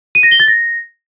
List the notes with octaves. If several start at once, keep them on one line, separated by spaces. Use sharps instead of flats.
D#7
A#6
G7
A6
A#6